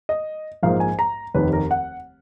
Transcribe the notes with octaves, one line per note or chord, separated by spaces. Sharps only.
D#5
A#1 G#2 F3 A#3 F5
G#5
A#5
F1 D#2 D#3 B4
A#4
F#5